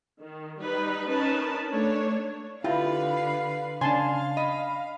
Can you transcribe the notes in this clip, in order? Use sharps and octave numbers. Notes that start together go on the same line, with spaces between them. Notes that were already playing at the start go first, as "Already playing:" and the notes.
D#3
G3 D#4 B4
C#4 D#4 A#4 B4 A5
A3 D4 C#5
D3 E4 F4 G4 B4 F5
C7
C#3 D4 F5 G#5 A5 C6
D#5 B5